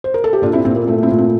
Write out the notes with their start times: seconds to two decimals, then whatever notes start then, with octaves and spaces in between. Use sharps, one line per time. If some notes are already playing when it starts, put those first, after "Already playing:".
0.04 C5
0.14 A#4
0.24 A4
0.33 G4
0.42 A#2 D4 F4
0.53 C4 E4
0.65 A#2 C4
0.76 A#3
0.87 A3 C4
1.03 C4 E4
1.11 A#2
1.18 C4